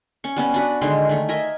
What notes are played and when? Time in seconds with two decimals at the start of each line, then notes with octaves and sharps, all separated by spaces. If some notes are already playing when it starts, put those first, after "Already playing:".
0.24 C#4 C#6
0.36 G3 B3 C#4
0.54 D4 F#4 B4
0.81 D3 D#3 G#3 C6
1.09 D#3 A3
1.29 A#4 D#5 E5 G#5